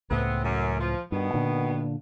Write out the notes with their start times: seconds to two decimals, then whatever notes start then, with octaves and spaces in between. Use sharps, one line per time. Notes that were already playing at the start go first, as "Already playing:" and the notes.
0.11 C#2 A2 B3 C4
0.44 F#2
0.80 F3
1.12 G2 B2 D#3 B3
1.34 A#2 D3